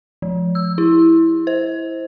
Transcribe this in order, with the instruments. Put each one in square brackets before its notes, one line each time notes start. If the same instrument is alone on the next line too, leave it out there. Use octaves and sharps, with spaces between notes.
[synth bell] F3
E6
E4
C5